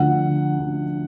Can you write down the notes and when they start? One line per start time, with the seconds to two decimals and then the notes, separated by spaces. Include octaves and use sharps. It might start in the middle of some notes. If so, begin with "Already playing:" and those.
Already playing: D2 D3 F3 F#5
0.57 D2 D3 F3